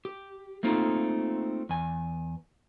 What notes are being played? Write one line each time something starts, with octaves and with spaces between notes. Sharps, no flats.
G4
A3 A#3 C4 D#4 F4
E2 G#5